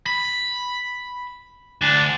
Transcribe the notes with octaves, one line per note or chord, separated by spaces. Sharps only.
B5
D2 D4